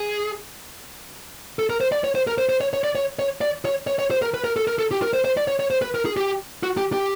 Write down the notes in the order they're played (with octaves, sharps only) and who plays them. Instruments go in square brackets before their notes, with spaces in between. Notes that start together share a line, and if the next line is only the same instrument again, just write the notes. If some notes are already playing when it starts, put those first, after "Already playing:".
Already playing: [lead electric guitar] G#4
A4
A#4
C5
D5
C#5
C5
A#4
C5
C5
C#5
C#5
D5
C#5
C#5
D5
C#5
C#5
C#5
C5
A#4
B4
A#4
A4
A#4
A4
G4
A#4
C5
C5
D5
C#5
C#5
C5
B4
A#4
G#4
G4
F#4
G4
G4